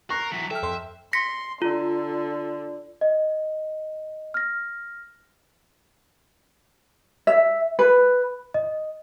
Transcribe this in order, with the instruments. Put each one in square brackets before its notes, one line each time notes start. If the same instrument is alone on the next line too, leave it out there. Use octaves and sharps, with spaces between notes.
[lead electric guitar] A#4 [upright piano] C#6 F#6 [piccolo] C7
[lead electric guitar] E3 F#3 [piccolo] B6
[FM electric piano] A4 F6 [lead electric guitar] E5 [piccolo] G5
[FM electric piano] F2 A4 C6
[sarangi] C6 [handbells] A#6 B6 C#7
[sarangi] D3 [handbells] F4
[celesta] D#5
F6 A#6
[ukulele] E5
B4
[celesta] D#5